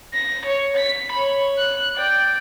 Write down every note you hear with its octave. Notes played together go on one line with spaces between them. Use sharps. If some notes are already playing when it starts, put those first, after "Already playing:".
A#6
C#5
B6
C#5 B5
F#6
D5 G5